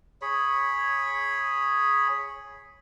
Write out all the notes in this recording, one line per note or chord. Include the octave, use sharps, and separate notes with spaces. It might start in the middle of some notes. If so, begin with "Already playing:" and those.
G#4 C#5 B5